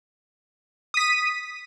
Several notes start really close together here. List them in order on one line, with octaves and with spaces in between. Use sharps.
D#6 B6 D#7